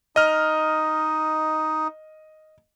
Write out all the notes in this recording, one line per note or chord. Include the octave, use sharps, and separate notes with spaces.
D#4 D#5 F6